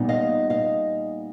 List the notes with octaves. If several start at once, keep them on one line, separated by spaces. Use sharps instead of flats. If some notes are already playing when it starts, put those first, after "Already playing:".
Already playing: A#2 G3 B3 D#4
D#5 F5
D#5 F5